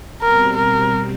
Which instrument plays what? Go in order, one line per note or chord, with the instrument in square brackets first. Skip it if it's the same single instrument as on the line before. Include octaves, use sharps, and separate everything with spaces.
[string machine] B2 G3 C4 [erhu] A#4
[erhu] A#4